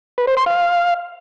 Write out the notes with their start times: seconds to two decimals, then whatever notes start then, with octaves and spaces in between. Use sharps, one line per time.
0.18 B4
0.27 C5
0.37 C6
0.46 F5